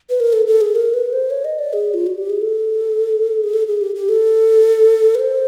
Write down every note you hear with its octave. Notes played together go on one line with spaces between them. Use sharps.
B4
A#4
A4
A4
G#4
A#4
B4
C5
C#5
D#5
D5
G#4
F4
F#4
G4
G#4
A4
G#4
A4
G#4
G4
G4
A4
B4
C5